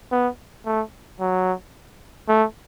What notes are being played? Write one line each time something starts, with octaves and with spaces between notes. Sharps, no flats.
B3
A3
F#3
A3